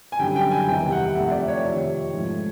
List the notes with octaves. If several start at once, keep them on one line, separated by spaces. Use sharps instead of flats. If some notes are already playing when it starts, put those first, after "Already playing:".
G#5
F#2 D3 G3 G5
G5
G#5
E2 C3 D#3 G3 G5
F#5
F2 C3 F3 A3 E5
D5
C#5
F2 C3 D#3
G#2 F3 A3